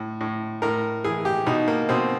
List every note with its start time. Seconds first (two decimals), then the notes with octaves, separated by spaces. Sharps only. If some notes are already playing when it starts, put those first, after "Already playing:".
Already playing: A2
0.21 A2
0.62 A2 A#4
1.04 E3 G#4
1.25 G4
1.46 B2 D#4
1.68 A#3
1.89 B2 C4